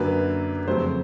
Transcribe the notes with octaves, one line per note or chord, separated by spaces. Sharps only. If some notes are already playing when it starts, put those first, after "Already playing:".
Already playing: F#2 D3 F#3 A#3 B4
F2 C#3 F#3 A3 C5